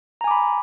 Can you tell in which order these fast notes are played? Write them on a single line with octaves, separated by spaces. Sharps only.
A#5 G#5 D6 B5